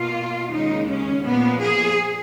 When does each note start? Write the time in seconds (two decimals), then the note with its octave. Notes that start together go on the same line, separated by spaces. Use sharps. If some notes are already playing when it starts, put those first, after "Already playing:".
Already playing: B2 A#3 F4
0.51 D#2 C#3 G#3 D#4
0.87 C#4
1.24 A#2 F3 A#3 B3
1.60 G#4